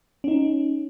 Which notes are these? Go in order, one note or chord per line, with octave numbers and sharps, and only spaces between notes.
C#4 D#4